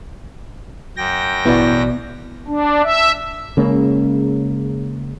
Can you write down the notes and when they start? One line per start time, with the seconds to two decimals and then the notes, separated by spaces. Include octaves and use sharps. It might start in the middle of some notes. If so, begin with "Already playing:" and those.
0.97 F#2 G5 A#6
1.45 A1 B2 B3 E4 D5
2.48 D4
2.83 E5
3.57 C#3 G#3 A#3 C#4